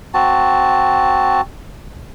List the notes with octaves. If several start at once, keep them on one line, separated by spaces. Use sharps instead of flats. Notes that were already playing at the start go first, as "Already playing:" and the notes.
C4 F#4 A5